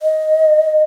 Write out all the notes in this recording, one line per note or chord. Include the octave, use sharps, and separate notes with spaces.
D#5